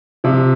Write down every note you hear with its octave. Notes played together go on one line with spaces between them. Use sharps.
C3 F3